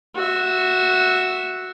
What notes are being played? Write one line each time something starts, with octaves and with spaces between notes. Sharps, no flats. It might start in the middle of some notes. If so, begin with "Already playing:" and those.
F#4 E5